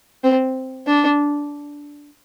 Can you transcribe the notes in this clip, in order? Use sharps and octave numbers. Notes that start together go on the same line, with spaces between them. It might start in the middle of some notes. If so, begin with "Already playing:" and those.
C4
D4